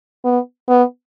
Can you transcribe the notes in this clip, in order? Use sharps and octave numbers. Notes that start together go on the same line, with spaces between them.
B3
B3